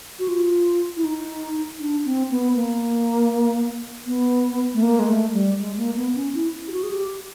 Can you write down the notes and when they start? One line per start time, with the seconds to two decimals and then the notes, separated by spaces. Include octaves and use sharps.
0.19 F#4
0.28 F4
0.97 E4
1.04 D#4
1.80 D4
2.05 C4
2.31 B3
2.56 A#3
4.07 B3
4.74 A3
4.83 A#3
4.99 G#3
5.08 A3
5.33 G3
5.59 G#3
5.77 A#3
5.96 B3
6.15 C#4
6.35 E4
6.68 G4
6.72 F#4
6.83 G#4
6.91 G4